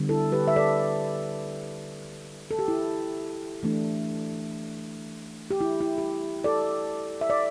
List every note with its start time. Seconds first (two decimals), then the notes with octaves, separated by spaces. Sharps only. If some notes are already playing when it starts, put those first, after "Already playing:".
Already playing: D3 G3 B3
0.09 E4 A4
0.32 G4 B4
0.48 E5
0.56 A4 D5
2.51 A4
2.59 G4
2.68 E4
3.63 E3 A3 D4
5.51 G4
5.61 E4
5.81 E4
5.98 G4
6.44 A4 D5
7.21 E5
7.30 D5